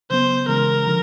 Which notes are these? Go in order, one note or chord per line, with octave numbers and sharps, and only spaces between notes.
C#3 F#3 B3 C5
C#3 E3 G#3 A#4
D3 F3